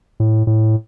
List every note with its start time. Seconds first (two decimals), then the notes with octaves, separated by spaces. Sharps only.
0.20 A2
0.47 A2